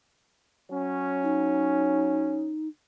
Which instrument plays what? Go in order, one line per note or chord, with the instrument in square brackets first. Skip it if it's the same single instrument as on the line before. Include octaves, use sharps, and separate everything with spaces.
[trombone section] F#3 C#4
[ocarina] D#4